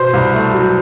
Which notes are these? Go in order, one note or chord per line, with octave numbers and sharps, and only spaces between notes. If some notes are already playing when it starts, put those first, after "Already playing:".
Already playing: B2 C5
C2
A3
F#3